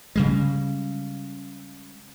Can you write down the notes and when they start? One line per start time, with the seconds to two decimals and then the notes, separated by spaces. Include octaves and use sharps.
0.16 C#3 G3 G#3